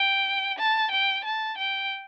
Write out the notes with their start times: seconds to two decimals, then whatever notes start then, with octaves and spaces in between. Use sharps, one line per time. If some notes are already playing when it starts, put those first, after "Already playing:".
Already playing: G5
0.58 A5
0.91 G5
1.25 A5
1.58 G5